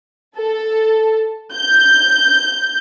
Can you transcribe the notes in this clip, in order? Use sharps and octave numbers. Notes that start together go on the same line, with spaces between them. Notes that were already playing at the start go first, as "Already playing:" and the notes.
A4
G6